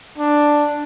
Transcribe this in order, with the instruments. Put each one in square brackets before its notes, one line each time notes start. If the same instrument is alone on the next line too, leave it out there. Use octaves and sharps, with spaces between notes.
[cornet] D4